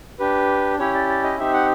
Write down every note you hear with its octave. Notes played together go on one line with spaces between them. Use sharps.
D4 G4 B4
C#4 E4 G4 C#5
D5
D5
D#5
C4 D#4 G4 E5
F#5